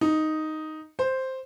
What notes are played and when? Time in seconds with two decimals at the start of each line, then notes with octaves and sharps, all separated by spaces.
0.01 D#4
0.99 C5